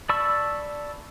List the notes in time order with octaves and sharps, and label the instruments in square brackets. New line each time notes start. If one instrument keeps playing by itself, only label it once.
[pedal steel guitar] D5 A5 B5 C#6 E6